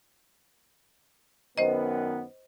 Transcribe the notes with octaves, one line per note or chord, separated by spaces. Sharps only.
F#2 D#3 B3 C5 D#5